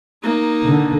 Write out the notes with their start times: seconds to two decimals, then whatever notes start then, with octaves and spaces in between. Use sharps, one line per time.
0.23 A#3 D#4
0.65 D3